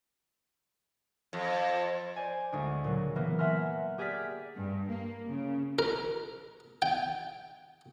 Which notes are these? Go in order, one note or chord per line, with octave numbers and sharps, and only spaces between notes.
F2
C5 D5 G#5
D2 G#3 D4
A#2 C#3 F#3
E3 A#3 B3
E5 F#5 G#5 A#5 C6 F6
G4 G#4 D5 F6 B6
G2
A#3
C#3
A#4
G5